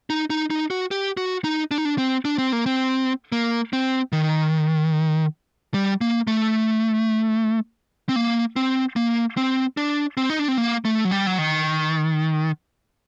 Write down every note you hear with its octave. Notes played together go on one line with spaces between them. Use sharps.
D#4
D#4
D#4
F#4
G4
F#4
D#4
D4
D#4
D4
C4
D4
C4
A#3
C4
A#3
C4
D#3
G3
A#3
A3
C4
A#3
C4
A#3
C4
D4
C4
D#4
D4
C4
A#3
A3
F#3
G3
F#3
D#3